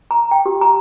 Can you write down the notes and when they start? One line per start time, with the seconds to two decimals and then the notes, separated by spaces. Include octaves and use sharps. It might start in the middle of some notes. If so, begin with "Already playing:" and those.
0.11 A#5
0.31 G5
0.46 G4
0.61 A#5